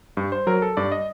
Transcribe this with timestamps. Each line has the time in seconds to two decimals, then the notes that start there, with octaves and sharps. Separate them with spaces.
0.17 G2
0.32 C5
0.47 F#3 A#4
0.62 A4
0.77 G2 D5
0.92 D#5